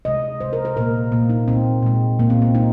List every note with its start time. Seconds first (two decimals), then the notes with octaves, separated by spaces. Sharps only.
0.05 C3 G#3 D#5
0.40 C3 G#3 C5
0.53 A#4
0.65 A#4
0.76 A#2 A#3 A#4
1.12 A#2 A#3
1.30 D#4
1.48 A#2 G#3 C4
1.83 A#2 G#3
2.19 A#2 G#3 A#3
2.30 C4
2.42 C4
2.55 G#3 D#4